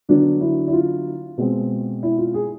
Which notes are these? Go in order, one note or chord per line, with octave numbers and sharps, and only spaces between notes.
D3 F#3 B3 D4
E4
E4
F4
B2 G#3 C4
E4
F4
G#4